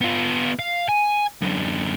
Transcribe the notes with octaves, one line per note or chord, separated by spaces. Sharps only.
B3 F4
F5
G#5
F#2 D3